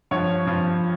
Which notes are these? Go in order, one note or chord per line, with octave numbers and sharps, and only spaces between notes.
G2 F3 C#5
G2 F3